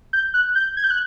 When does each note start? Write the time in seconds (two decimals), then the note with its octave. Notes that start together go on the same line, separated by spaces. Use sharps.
0.13 G6
0.34 F#6
0.55 G6
0.77 G#6
0.84 G6
0.91 F#6